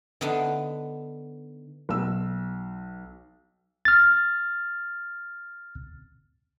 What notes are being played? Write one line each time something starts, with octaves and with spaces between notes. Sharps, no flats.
D3 B3 D4 D#4
B1 E6
F6 A6